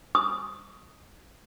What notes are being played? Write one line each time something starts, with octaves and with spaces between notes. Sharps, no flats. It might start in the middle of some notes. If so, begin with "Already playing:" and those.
D#6